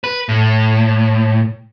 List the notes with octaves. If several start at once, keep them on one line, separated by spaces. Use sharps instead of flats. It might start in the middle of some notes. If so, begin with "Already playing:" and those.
B4
A2